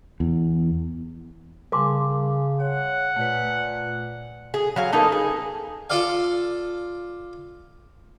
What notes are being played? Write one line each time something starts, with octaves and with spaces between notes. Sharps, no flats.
E2
C#3 G3 A#4 G#5 A5 C6 D6
C#5 F#5
A#2 A3 B4
G#4
F#3 F5 G#5
A#3 B3 D#4 A4
G#4
F4 A4 D5 F5